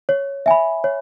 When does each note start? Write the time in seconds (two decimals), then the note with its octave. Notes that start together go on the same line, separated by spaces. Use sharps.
0.09 C#5
0.46 E5 G#5 B5
0.84 C#5